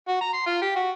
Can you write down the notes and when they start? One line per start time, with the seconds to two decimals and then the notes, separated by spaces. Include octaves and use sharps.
0.08 F#4
0.21 A#5
0.34 C6
0.46 F4
0.62 G4
0.76 F#4